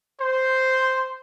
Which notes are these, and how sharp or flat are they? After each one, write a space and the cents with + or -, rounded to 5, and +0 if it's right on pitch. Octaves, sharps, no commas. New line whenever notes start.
C5 -5